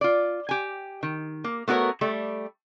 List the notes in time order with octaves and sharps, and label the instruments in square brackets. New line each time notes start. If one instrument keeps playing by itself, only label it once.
[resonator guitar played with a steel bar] F4 D5
G4 G#5
D#3
A#3
A3 B3 F#4 A#4 C#5
G3 A3